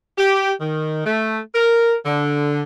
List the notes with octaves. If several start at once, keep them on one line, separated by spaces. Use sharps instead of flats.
G4
D#3
A3
A#4
D3